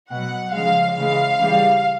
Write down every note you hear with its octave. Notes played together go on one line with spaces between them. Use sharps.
B2 F#3 F#5
C#3 F3 G#3 F5
C#3 E3 G#3 F5
C#3 E3 G3